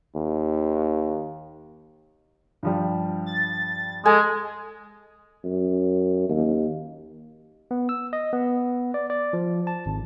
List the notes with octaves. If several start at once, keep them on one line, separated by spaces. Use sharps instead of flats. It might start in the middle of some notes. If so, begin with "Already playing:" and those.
D#2
G2 F3 G3
A6
G#3 A4 G#5
F#2
D#2
B3
E6
D#5
B3
D5
D5
F3
A5
G#1